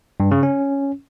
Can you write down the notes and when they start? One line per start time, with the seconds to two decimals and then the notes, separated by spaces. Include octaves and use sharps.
0.20 G2
0.31 C#3
0.43 C#4